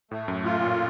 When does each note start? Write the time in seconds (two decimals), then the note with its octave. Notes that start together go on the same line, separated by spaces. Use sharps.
0.11 A2 A3
0.28 F#2
0.44 A2 F4
0.61 A#2